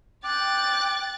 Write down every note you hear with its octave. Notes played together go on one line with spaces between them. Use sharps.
G5 D6 F#6 A6